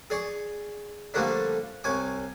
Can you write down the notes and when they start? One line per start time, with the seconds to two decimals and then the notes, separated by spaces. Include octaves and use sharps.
0.10 G#4 D5 C#6
1.14 D3 F3 G3 A3 A#3 D4
1.84 C2 C#5 G#5 D6